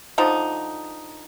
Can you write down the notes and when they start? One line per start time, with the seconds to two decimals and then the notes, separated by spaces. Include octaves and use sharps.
0.18 D3 F3 D#4